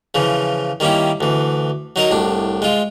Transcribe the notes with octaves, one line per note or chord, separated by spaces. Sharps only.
C#3 E3 F3
D#3 G3 A#3 C#4 E4
D2 E3
F#3 D#4 A#4
C2 A2 D4
G#3 F4